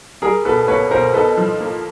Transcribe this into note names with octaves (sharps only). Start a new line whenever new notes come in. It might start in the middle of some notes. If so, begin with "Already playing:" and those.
G3 G#4 A#4
B2 A4 B4
A#3 B4 C#5
B2 A#4 C5
D#4 A4 B4
F3
A#3